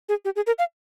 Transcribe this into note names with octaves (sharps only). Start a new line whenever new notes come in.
G#4
G4
G#4
A#4
F5